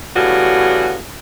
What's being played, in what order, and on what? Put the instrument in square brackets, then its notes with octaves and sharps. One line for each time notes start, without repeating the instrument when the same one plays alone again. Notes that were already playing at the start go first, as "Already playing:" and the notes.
[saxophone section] A2 C#3 G3 B3 F#4